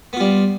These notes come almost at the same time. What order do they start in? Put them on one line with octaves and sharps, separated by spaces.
B3 F4 G3